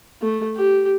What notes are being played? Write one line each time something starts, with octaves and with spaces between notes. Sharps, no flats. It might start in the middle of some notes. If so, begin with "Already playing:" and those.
A3
G4